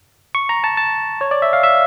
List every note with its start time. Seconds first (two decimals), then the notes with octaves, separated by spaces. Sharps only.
0.35 C#6
0.49 A#5
0.64 A5
0.77 A5
1.21 C#5
1.31 D5
1.42 E5
1.53 F5
1.64 E5